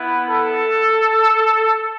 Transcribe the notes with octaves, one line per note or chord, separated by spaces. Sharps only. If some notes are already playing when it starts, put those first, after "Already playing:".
Already playing: B3 E4
A4